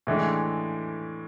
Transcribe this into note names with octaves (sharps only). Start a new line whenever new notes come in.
A2 E3 G#3 D4